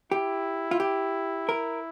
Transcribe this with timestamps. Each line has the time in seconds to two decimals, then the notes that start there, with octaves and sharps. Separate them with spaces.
0.11 E4 G4
0.71 F4
0.80 G4
1.49 A#4